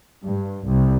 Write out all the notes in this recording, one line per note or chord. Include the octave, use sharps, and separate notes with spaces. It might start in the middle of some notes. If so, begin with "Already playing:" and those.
G2
C2